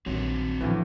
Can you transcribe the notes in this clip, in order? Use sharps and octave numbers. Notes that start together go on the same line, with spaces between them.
A#1 G2 D#3 F#3 C4 F#4 C#5
D2 A2 C#3 E3 F3